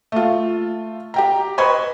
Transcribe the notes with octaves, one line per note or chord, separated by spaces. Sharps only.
A3 F4
G4 G5 A#5
B4 C5 D#5 B5 C#6 G#6